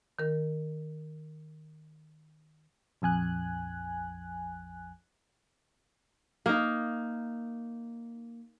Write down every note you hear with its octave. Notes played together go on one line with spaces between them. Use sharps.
D#3 A#4
A#1 F2 G#5 F#6
A#3 D#4